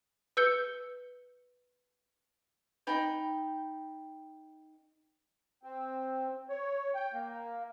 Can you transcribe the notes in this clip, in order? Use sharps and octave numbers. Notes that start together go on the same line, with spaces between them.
B4 E6 G6 C#7 G7
D#4 G5 B5
C4
C#5
G5
A#3